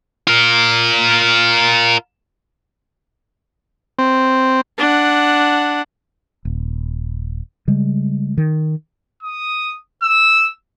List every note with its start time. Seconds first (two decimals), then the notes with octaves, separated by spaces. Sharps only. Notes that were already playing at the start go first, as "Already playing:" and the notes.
0.27 F4 A#4
3.99 C4
4.78 D4 F#5
6.45 D#1
7.68 C#3 G3 G#3
8.38 D#3
9.23 D#6
10.03 E6